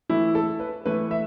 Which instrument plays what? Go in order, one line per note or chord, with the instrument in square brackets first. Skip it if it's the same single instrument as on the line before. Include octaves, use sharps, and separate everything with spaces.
[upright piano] E3 A3 E4
A4
B4
E3 A3 E4 B4
E5